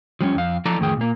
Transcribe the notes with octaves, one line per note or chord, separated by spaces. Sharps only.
F3 G3 C#4
F2 F5
F3 E4 A4 D5 A5 A#5
F2 A2 D#3 E3 G#4 G5
A#2 A#3